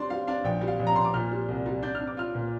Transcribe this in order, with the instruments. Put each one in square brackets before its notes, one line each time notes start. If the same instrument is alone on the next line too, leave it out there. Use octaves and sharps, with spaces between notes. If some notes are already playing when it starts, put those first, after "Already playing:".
Already playing: [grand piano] G3 C4 D4 C6
G3 F5
D4 F5
A#1 G5
G3
F5
A#1
A#5
A#1 C6
D6
A#2 F6
G3
C2
G3
D4 G6
F6
D4
D6
F4 F6
A#2